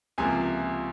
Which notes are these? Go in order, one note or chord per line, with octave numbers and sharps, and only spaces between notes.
C#2 C3 F3 A#3 G#5 C6